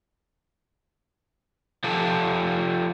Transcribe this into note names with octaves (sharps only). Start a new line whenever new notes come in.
F3 G4 A4